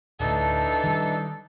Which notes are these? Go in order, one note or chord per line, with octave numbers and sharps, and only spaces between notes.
D1 D2 E3 D4 D#4 A4
D#3 G3